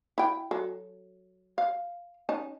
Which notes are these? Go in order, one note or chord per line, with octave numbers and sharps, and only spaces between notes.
E4 G5
F#3 A4
F5
C#4 D#4 A5